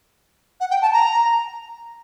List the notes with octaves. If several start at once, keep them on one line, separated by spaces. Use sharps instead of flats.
F#5
G5
A5
A#5